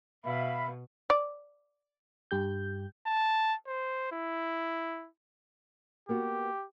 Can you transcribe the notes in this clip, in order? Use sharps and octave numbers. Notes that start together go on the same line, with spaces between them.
B2 E5 F5 B5
D5
G2 G4 G6
A5
C5
E4
A#3 B3 F#4 G4